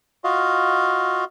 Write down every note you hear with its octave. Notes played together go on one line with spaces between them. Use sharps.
F4 F#4 D#5 F5